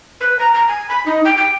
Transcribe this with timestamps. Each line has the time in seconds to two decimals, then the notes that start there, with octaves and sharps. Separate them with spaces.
0.21 B4
0.39 A#5
0.54 A#5
0.68 G#5
0.89 B5
1.06 D#4
1.25 G5
1.37 G5